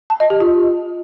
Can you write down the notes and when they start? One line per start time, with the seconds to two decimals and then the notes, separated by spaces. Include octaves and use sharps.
0.10 A5
0.20 D#5
0.30 G4
0.40 F4